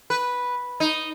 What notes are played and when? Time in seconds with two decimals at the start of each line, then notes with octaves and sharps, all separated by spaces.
0.10 B4
0.80 D#4